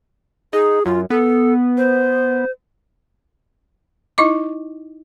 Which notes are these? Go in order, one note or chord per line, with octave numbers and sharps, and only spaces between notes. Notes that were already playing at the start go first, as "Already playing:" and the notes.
D#4 G#4
F#2 F4
B3 A4
C5
D#4 E4 D#5 D6